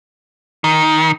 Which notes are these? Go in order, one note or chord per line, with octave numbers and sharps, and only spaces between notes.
D#3